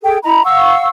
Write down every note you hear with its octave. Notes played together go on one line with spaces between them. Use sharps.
G#4 A4 G5
E4 D#5 A#5 B5
F5 F#5 C#6 E6